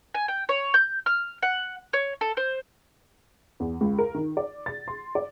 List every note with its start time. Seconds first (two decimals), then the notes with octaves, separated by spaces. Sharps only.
0.14 G#5
0.28 G5
0.49 C#5
0.74 G6
1.06 F6
1.42 F#5
1.93 C#5
2.21 A4
2.37 C5
3.60 E2
3.81 C#2
3.98 A#4
4.14 D#3
4.37 D5
4.66 A6
4.88 C6
5.15 D5